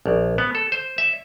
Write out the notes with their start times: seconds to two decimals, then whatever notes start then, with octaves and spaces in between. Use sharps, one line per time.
0.06 A#1
0.38 B3
0.55 A4
0.72 C5
0.98 E5